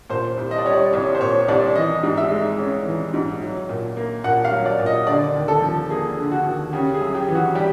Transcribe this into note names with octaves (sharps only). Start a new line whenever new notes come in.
A#2 C5
C2
D#5
D5
G3 C#5
D5
C2 C#5
C5
A#2 C#5
C2 D5
E3 D#5
G#2
E5
G#3
C#4
E3
G#2
F#3
A#2
A#3
A#2 F#5
F5
F#3
D5
A#2
D#5
D3 D5
D#2
A4
F3
A#3 G#4
D3
F#4
D#2
C#3 G4
G#4
F#2
G4
E3
F#4
G3 G4